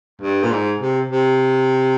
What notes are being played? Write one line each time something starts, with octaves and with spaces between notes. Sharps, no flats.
G2
A#2
G#2
C3
C3